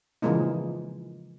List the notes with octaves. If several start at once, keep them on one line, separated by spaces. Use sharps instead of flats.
C#3 E3 F3 G#3 A#3 D#4